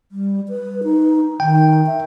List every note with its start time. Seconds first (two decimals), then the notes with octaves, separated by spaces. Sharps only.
0.12 G3
0.49 B4
0.84 D#4
1.40 D#3 G5
1.86 E5